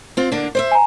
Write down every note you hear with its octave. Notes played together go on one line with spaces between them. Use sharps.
C4 F4
D3 A#3 D4
C5 D5 E5
G#5 A#5